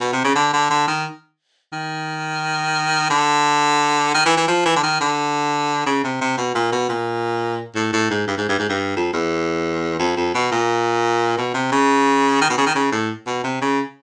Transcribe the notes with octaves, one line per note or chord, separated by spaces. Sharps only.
B2
C3
C#3
D3
D3
D3
D#3
D#3
D3
D#3
E3
E3
F3
E3
D3
D#3
D3
C#3
C3
C3
B2
A#2
B2
A#2
A2
A2
G#2
G2
G#2
G2
G#2
G2
F2
E2
F2
F2
B2
A#2
B2
C3
C#3
D#3
B2
C#3
D#3
C#3
A2
B2
C3
C#3